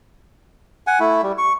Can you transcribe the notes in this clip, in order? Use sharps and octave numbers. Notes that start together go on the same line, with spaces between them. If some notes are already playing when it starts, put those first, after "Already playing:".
F#5 G#5
A3 E4
G3
C#6